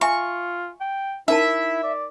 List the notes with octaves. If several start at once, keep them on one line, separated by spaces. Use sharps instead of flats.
F4 E5 G#5 C#6
G5
D#4 E4 A#4 E5 A5
D5